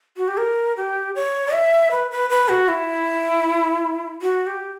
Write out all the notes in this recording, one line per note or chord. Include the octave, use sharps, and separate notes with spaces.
F#4
G4
A#4
G4
C#5
E5
B4
B4
B4
F#4
E4
F#4
G4